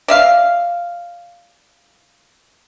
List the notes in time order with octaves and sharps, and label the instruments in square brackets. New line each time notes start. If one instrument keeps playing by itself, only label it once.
[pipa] D5 E5 F5